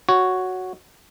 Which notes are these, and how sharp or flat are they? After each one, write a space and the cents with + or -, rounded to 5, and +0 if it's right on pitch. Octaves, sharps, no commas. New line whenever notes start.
F#4 +0 C#5 +0